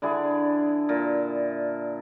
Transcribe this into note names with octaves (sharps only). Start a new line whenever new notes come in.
D3 D4 E4 G#4
A#2